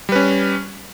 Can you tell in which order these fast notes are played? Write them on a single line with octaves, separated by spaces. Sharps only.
G3 B4 C#4